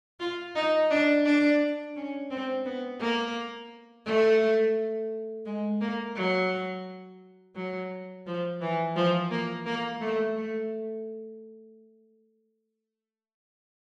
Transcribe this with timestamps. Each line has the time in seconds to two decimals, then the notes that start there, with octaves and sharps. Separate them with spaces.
0.20 F4
0.55 D#4
0.90 D4
1.25 D4
1.96 C#4
2.30 C4
2.65 B3
3.00 A#3
4.05 A3
5.46 G#3
5.81 A#3
6.16 F#3
7.55 F#3
8.26 F3
8.61 E3
8.96 F3
9.31 A#3
9.66 A#3
10.01 A3
10.36 A3